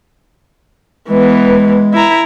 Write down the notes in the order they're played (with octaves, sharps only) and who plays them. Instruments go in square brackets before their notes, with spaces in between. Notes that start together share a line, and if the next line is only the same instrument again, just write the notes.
[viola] E3 B3 [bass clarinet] G#3
[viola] E4 A#5